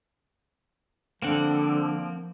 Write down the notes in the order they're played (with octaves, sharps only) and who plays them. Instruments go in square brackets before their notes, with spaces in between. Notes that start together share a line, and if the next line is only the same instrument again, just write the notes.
[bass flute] D3 [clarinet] F3 [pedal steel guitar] A#3 C4 F#5